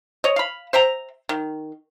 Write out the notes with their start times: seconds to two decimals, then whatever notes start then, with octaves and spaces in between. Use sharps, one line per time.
0.24 C#5 D#5
0.36 F5 B5
0.73 C5 E5 G5 A#5
1.29 D#3